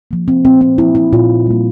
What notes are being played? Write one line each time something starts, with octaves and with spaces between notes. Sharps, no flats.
F3 A#3
C4
A#2 C4
C4
F3 A#3 E4
E4
A#2 F4
G3 A#3